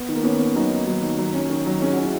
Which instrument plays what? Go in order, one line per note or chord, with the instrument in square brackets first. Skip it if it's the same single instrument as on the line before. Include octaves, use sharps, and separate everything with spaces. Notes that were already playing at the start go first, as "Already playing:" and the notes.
Already playing: [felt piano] B3
[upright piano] D#3
[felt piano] A#3
[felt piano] B3 [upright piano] C#4
[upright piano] C#4
[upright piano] F#3 [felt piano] D#4
[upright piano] D#3
F#3
D#3
F#3
C#4
D#3
F#3
[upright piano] C#4 [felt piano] G#4
[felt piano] F#4
[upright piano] C#4
[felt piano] E4